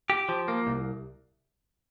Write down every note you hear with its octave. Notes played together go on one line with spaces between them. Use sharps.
G4
F3
A#3
C2